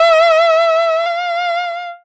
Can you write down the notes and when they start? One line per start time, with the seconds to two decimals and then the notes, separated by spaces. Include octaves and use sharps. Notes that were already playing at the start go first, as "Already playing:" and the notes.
Already playing: E5
1.06 F5